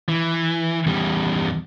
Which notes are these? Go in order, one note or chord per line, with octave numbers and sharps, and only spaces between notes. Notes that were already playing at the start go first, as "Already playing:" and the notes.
E3
E2 G3